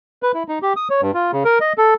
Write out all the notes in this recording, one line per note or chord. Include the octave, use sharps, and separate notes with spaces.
B4
E4
D#4
G4
D#6
C#5
G2
F4
C#3
A#4
D#5
A4